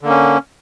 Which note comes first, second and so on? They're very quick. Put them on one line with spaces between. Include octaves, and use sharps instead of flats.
D3 A#3 C#4